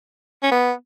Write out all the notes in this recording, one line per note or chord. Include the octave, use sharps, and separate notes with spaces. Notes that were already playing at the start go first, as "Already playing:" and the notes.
C#4
B3